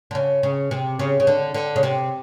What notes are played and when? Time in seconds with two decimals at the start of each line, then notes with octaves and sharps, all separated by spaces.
0.11 D3
0.15 C#3
0.43 C#3
0.71 C3
0.99 C#3
1.20 C#3
1.27 D3
1.54 D3
1.76 C#3
1.83 C3